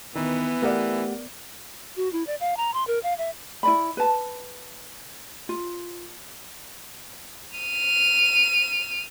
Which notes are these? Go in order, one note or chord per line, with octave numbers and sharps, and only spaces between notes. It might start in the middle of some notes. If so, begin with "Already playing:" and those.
D#3 E3 B3
A3 G4 A#4 D5 F#5
F#4
E4
D5
F5
A#5
C6
A#4
F5
E5
E4 D5 B5
B4 A5
F4
F6 D#7